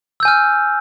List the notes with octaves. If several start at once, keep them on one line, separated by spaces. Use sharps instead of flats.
G#5 E6 F6 G6